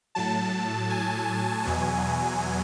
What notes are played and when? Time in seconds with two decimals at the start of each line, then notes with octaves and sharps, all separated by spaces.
0.15 A2 F#3 A5
0.90 G#5
1.65 E2 B2 F#3